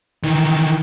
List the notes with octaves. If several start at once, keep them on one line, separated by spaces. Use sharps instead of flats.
D#3 E3